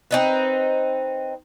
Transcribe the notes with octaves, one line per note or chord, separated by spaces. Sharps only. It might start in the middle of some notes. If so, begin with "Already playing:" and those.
C4 D#4 B4